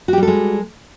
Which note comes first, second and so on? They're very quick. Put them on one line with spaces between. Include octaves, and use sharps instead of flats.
F#4 G4 G3 A4 G#3